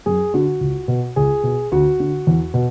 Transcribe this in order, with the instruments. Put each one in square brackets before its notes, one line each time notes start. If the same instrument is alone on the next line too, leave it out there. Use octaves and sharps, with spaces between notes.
[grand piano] F#2 G#4
D3 F#4
C#2
B2
C#2 G#4
B2
D2 F#4
D3
E2
B2